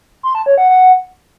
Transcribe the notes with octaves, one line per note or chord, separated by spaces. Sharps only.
C6
A5
C#5
F#5
F#5